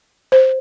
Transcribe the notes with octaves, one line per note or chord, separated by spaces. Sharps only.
C5